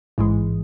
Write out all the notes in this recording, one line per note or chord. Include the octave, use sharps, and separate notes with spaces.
A1 G#2 E3 G#3